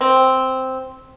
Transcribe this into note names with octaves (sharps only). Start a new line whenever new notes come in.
C4